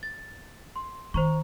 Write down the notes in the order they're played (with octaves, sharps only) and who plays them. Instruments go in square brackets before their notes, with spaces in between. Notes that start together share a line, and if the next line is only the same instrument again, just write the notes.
[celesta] A6
C6
[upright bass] D#3 [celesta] C5 A#5 C#6